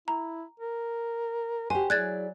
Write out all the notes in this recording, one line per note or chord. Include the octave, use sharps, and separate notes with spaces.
E4 A#5
A#4
F#4 G4 C5 G#5
F#3 E4 G#4 D5 F#6 G#6 A6